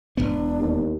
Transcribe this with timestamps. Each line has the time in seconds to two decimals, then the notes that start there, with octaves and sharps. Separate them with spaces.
0.17 E1 F2 B3 D4
0.59 D#2